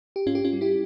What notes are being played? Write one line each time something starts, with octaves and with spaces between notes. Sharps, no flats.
G4
G#2 C#4 F4
G4
C#4 F4
G3
E4 G4